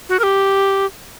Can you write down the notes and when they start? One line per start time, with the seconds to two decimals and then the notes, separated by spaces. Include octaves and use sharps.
0.09 F#4
0.19 A#4
0.23 G4